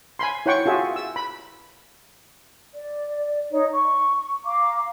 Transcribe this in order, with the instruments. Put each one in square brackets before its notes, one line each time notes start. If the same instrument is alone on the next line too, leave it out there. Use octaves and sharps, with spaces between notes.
[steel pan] G#5 B5 C6
E4 C#5 F#5 G5 C6 C#6
F4 F#4 G#4 E5
E6
B5
[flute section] D5
D#4 C#5
C#6
F5 A#5 D6